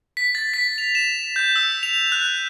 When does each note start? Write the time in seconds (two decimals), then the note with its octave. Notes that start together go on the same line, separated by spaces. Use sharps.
0.17 B6
0.35 A6
0.54 B6
0.78 F7
0.95 E7
1.36 G6
1.56 E6
1.83 F7
2.12 F#6